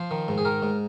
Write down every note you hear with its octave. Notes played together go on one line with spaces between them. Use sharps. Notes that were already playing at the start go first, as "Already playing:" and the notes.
Already playing: F3 C5
D#3
G#2
G#4
D#3 A#4
G#2